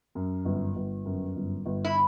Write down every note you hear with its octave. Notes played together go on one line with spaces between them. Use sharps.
F#2
G1
G1
F#2
G1
G1
E4